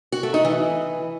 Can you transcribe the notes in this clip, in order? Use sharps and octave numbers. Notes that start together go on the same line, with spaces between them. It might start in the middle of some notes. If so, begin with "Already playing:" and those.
F#4
A3
D#4
E3